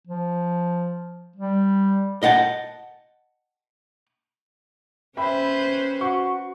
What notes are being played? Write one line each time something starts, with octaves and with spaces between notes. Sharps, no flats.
F3
G3
D#5 F#5 G5 A5
C#4 B4 C5 E5 G5 B5
F#4 C#6